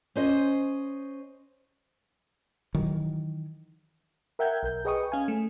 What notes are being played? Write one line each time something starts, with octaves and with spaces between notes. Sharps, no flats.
C#4 C5 D#5
D#3 E3 F#3
A#4 E5 F#5 G5 G6 G#6
B1 A#4 G6
G#4 B4 D#5 G5 C#6 D#6
C#4 F5 G#5
A3